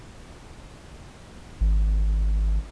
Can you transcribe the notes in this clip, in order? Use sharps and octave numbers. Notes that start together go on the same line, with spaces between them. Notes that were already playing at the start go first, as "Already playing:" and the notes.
G#1